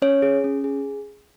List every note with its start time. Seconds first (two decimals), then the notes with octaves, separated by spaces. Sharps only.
0.02 C#4 C#5
0.22 G#4
0.44 C#4
0.64 G#4